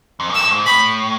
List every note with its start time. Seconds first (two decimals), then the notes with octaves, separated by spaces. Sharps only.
0.20 F2
0.29 F#2
0.35 E6
0.40 G2
0.51 G#2
0.66 A2 B5